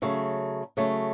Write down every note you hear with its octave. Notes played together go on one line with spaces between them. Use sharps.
C#3 F#3 A3
C#3 F#3 A3